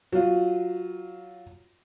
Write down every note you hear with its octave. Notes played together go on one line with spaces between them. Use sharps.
F#3 F4